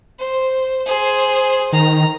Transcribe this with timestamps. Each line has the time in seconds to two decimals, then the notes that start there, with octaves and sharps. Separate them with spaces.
0.19 C5
0.86 G#4 C5
1.72 D#3 A#5